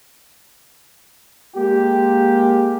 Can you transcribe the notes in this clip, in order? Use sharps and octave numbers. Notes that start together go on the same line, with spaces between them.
G#3 A#3 G4